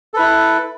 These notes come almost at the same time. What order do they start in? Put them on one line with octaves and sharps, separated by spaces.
A4 B4 E4